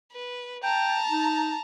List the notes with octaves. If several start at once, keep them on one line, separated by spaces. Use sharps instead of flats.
B4
G5 A5 A#5
D#4